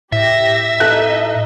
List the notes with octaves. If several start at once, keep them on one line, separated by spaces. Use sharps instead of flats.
A2 G4 E5 A#6
D#4 A4 D#5 F#6